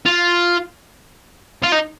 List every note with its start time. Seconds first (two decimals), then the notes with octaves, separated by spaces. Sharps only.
0.06 F4
1.63 F4
1.72 D#4